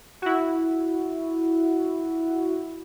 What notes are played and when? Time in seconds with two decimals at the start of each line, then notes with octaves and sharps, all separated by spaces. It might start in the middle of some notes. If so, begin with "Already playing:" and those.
0.22 E4 F#4